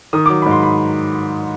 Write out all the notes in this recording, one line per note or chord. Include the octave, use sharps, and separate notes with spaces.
D#3 D#6
F#3 D6
B5
G#2
C6
B5